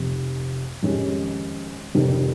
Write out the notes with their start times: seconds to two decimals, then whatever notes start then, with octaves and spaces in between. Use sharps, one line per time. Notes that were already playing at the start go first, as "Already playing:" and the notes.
Already playing: F1 F2 C3
0.83 F2 D#3 G#3 C#4 G4
1.95 F1 F2 D#3 G3